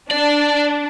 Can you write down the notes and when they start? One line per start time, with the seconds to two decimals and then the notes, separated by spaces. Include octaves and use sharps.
0.11 D4 D5